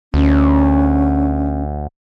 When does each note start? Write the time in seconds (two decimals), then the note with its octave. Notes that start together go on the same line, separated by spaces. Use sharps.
0.14 D2 C#4